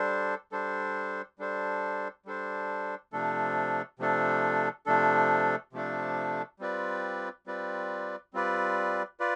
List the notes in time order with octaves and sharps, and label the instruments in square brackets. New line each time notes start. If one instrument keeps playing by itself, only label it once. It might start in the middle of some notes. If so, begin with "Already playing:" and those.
Already playing: [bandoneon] G3 D4 A4 C5
G3 D4 A4 C5
G3 D4 A4 C5
G3 D4 A4 C5
C3 F3 A3 D4 A4
C3 F3 A3 D4 A4
C3 F3 A3 D4 A4
C3 F3 A3 D4 A4
G3 C4 F4 B4 D5
G3 C4 F4 B4 D5
G3 C4 F4 B4 D5
F4 B4 D5